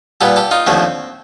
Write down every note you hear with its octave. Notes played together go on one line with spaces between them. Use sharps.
A#2 G3 B3 G4 A4
G4 A4
D#4 F4
D#2 D3 F3 A3 C4